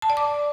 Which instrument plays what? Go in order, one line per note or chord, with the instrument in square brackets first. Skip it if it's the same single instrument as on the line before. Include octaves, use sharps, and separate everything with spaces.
[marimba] A5
D5
D6